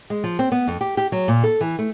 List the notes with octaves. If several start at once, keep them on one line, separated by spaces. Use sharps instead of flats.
G#3
F3
C4
B3
F2
G4
G4
F#3
A#2
A4
E3
A3